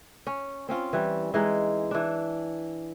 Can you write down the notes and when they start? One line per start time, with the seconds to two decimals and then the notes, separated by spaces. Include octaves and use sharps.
0.27 C#4
0.69 C4 C#4 F4
0.93 E3 G3
1.34 E3 G#3 D#4
1.91 E3 D4